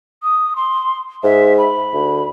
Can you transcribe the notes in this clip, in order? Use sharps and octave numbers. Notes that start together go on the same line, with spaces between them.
D#6
C6
G#2 E5
B5
D2